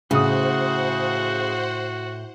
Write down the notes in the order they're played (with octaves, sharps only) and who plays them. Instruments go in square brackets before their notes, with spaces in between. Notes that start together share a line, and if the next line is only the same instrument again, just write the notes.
[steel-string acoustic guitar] A2 [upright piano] C#3 D#6 [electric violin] F#4 [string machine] C5 F#5